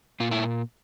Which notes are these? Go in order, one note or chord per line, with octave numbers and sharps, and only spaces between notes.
A#2 F4
E4